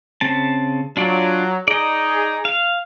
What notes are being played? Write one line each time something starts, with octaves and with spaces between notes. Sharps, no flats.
C#3 C4 A5
F#3 D4 F4 D5
D#4 G#4 D5 D#5
F5